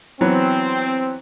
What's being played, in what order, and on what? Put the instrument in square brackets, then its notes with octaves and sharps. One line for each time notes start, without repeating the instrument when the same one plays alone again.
[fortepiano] E3 F#3 B3 [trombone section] C4